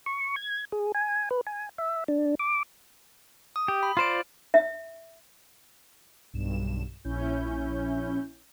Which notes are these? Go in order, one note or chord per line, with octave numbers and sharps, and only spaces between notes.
C#6
G#6
G#4
G#5
B4
G#5
E5
D4
D6
D#6
G4
B5
F4 C5 D5 F6 D7
E5
B1 G2 E7
A#1 C#4 E4 G6